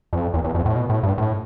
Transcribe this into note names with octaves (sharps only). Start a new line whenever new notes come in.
F2
E2
E2
F2
A2
B2
A2
G2
A2